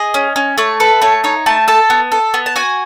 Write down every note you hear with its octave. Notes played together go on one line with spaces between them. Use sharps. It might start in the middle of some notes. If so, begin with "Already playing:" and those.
Already playing: G#4 D#5
C#4
C#4
A3 C#5
A4 B4
A3 C#5
D#4 C#5
A3 A5
A4 A5
B3
A4
B3
A5
F#4 G#5